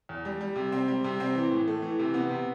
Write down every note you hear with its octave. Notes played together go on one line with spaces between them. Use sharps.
E2
G3
G3
C3
C4
G3
C3
C4
E3
A2
A3
E3
C3
B3
C3